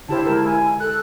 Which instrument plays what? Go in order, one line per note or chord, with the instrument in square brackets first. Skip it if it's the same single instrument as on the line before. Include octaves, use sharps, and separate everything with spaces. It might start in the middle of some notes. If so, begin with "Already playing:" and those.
[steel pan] D3 G4 C5 [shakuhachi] E4 [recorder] A5
[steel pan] G#3 A#4
[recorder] G#5
[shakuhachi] A4 [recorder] F#6